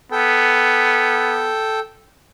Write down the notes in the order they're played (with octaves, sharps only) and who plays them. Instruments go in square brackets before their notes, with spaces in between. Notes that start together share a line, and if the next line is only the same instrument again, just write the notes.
[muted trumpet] B3 [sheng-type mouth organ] A4 G5